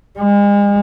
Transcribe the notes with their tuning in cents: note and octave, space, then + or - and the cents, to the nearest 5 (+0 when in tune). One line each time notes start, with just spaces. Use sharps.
G#3 -40